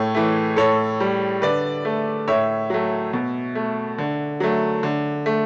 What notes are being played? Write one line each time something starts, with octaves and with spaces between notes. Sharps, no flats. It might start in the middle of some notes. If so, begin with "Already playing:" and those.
Already playing: A2 A4 C#5
E3 A3
A2 A4 C#5
G3
D3 B4 D5
A3
A2 C#5 E5
F#3 A3
B2
A3
D3
F#3 A3
D3
A3